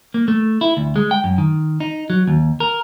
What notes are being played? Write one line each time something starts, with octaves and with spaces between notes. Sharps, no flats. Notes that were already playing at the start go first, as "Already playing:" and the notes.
A#3
A3
E4
D2
G#3
G5
F#2
D#3
D#4
F#3
D#2
A#4